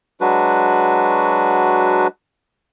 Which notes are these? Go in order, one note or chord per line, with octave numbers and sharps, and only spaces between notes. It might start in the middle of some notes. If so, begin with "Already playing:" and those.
F#3 G#3 D4 F#4 B4